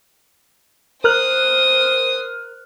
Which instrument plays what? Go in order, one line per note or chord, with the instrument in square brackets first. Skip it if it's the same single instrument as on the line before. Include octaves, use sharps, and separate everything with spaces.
[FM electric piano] A#4 F6 F#6 [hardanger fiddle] C5 D#6